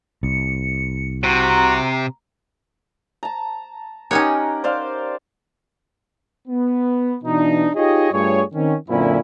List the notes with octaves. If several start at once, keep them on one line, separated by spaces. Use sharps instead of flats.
C2 C#7
C3 F#4 A#5
A5 A#5
C#4 D#4 G4 A#4 C#5 F#5
C5 D5 F5
B3
B2 E3 D4 D#4
D#4 F4 G4 G#4 C#5 D#5
G2 A3 F4 G#4 C#5
D#3 C4 C#4
F#2 A#2 D3 C4 C#4 E4